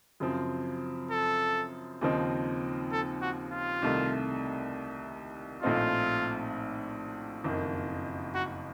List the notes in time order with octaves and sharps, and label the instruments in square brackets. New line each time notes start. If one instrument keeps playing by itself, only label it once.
[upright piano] F#2 C#3 F3 C4
[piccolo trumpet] A4
[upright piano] D#2 C#3 F3 C4 D#4
[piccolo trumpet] A4
F#4
F4
[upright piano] C2 C3 D#3 A3
[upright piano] A#1 A2 A3 C4 D#4 [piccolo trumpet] F4
[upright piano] F#1 F2 D#3
[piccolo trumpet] F#4